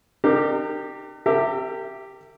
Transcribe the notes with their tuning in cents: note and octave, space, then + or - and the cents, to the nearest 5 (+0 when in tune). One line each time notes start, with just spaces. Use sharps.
D#4 -45 G4 +0 A#4 -25
G4 +0 A#4 -40 E5 +10